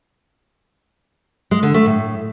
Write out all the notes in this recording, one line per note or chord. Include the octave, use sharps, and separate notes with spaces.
G#3
D3
A3
A2